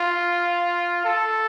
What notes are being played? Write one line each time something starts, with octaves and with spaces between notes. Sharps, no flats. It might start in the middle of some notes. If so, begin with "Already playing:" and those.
Already playing: F4
A4